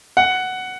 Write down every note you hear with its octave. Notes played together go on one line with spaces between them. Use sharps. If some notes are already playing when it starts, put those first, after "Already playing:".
F#5